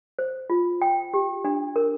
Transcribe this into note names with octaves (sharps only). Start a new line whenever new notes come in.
C5
F4
G5
G4
D4
A#4